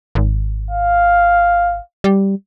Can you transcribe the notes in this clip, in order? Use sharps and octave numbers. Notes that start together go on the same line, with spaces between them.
G#1
F5
G3